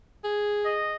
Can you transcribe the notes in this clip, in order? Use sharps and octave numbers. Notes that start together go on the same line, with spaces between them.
G#4
D#5